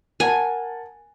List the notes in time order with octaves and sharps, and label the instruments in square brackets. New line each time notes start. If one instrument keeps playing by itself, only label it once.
[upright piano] A#4 F#5 A5 [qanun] G#5